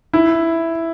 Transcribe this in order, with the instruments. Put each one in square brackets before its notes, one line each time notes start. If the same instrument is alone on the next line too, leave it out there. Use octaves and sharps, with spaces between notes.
[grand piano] E4